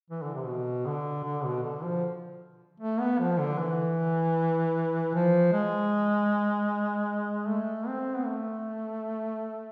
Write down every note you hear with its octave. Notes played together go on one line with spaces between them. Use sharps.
E3
D3
C3
B2
D3
D3
B2
D3
F3
A3
B3
F3
D3
E3
F3
G#3
A3
C4
B3
A3